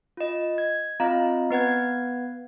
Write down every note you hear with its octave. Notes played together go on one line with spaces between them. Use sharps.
F4 D#5
G#6
C4 F4 D#5 F5 A#5
B3 B4 F#5 G#6